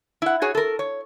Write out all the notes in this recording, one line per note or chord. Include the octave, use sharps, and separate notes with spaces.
E4 F#5
F#4 G#4 C#5
A4 A#4
C#5